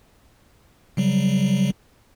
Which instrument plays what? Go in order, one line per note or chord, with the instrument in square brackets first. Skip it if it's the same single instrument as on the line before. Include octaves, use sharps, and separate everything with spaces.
[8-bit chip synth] C#3 F#3 G3